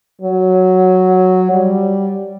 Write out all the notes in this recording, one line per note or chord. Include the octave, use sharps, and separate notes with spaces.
F#3
G3